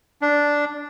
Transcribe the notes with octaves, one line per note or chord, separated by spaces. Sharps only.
D4